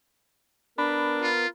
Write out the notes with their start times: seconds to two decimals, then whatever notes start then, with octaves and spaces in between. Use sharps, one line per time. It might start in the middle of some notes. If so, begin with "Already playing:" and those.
0.78 B3 D4 A#4 B5
1.22 F4